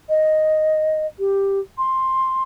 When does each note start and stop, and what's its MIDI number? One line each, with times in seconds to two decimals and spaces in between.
0.09 1.06 75
1.19 1.59 67
1.78 2.43 84